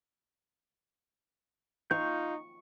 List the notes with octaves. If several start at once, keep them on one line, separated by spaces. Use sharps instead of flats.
D#4 F4 F5 C#6 G6